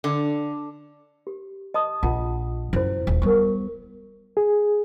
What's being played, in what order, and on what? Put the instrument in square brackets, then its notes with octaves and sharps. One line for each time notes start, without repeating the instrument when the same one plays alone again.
[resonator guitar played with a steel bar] D3
[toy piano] G4
D#5 A5 D#6
[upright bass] A#1 [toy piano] F4 F#5 A5
[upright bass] F#2 [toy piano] E4 C5
[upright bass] D#1
[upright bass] G3 B3 [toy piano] A#4 C#6
[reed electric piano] G#4